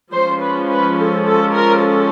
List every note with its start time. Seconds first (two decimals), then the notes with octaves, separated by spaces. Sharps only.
0.12 F3 G#3 C#4 C5
0.41 B4
0.69 B4
0.97 A4
1.25 A4
1.53 A#4
1.82 A4